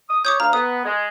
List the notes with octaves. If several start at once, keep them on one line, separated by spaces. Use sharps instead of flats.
D#6
C#5 D6 D#6 G6
D2 F5 A#5
B3 D#6
G#3